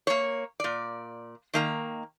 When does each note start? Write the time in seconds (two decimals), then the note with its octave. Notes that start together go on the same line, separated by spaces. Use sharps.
0.07 A#3 C#5
0.60 A#2 D5
1.54 D#3 A#3 A#5